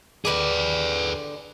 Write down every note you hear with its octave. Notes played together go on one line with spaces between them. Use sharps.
D3 G4 G#4 B4 D5